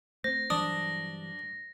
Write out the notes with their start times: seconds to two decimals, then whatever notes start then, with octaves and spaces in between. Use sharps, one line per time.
0.24 A3 C4 C5 A#6
0.50 G2 E3 F#3 D4 D#6